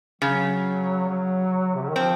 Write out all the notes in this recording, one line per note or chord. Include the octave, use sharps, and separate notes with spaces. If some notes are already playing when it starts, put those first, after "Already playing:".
C#3 F#3
F#3
C3
C#3
D#3
F3 C4